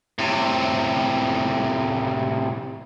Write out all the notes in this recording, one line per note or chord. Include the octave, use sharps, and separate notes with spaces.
A2 C3